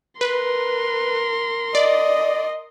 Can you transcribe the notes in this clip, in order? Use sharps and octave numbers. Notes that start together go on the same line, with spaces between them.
A#4 B4 C6
D5 D#5